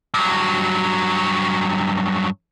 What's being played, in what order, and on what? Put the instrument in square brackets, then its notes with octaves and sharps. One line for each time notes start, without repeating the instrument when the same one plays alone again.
[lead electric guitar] G2 F#3